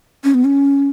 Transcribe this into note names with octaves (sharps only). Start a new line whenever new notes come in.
C#4
B3
C#4